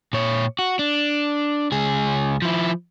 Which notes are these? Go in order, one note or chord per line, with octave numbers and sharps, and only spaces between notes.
A#2 C#5
F#4
D4
C#2 G#4
F3 E4